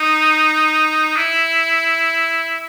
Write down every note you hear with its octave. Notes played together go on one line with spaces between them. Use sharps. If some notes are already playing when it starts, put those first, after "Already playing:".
Already playing: D#4
E4